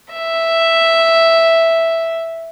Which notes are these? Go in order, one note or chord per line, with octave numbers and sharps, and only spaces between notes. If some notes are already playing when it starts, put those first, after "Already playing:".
E5